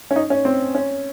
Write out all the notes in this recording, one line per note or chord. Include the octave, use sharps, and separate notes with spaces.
C#4
D#4
C#4
C4
C#4